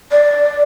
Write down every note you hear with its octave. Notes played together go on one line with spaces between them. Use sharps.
D5